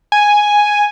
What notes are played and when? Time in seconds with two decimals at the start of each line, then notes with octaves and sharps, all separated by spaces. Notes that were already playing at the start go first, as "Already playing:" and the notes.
0.12 G#5